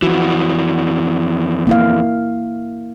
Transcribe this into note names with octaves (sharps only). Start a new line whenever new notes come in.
F2 E3 F#4
A#3 E4 F5